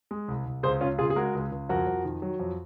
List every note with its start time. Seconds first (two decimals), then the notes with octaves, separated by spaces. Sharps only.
0.11 G#3
0.28 C2
0.46 C2
0.63 C#2 G#4 C5
0.81 C#2 C#4 F4
0.99 C#3 F4 G#4
1.10 G#4
1.16 G#3 F#4 A#4
1.35 C#2
1.52 C#2
1.69 F2 F#4 A#4
1.87 F2
2.05 D#3
2.22 F#3
2.40 F2